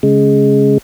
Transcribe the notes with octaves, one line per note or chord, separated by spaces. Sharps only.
C#3 G#3